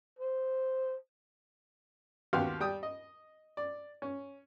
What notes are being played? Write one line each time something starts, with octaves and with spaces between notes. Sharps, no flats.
C5
D#2 B3 F#4 G4 F5 C6
G3 G5 D#6
D#5
D5
C#4